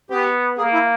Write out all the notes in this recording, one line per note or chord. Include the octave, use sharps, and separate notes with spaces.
B3 G4
A#3 G#4
E4